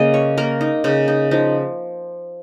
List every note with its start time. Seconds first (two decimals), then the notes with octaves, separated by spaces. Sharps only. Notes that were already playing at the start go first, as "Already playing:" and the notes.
Already playing: C#3 A#3 D#5
0.14 C#5
0.38 A#3 A#4
0.61 D#4
0.84 C#3 D#4
1.08 D#4
1.31 F3 D#4